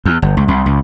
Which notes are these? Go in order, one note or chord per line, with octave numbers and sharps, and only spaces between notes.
E2
G1
C#2
C2
C#2